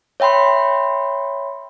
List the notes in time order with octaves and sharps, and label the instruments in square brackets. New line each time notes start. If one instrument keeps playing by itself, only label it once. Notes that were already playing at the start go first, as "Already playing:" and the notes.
[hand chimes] C#5 E5 G5 B5 C6